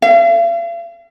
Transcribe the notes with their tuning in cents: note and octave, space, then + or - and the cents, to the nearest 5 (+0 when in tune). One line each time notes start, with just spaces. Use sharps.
F5 -45